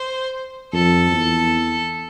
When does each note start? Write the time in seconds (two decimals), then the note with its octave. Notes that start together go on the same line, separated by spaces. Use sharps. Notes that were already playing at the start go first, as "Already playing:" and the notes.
Already playing: C5
0.73 F2 A4
1.12 E2